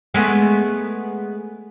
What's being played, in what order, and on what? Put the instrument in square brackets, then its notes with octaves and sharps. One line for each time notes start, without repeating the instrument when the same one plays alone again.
[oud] G#3 A3 B3